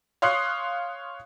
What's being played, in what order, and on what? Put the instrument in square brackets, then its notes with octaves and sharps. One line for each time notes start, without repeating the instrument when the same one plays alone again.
[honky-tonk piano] C#5 F5 C6 D#6 F#6 C7